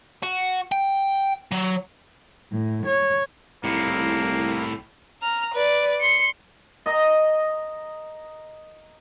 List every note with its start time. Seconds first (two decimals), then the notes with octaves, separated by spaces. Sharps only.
0.23 F#4
0.72 G5
1.52 F#3
2.52 A2
2.87 C#5
3.64 C2 A2 D#3 A#3
5.22 A#5 F6
5.54 B4 D5
6.01 C6 C#7
6.86 D#5 A#5